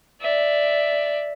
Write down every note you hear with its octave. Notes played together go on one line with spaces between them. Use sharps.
D5 E5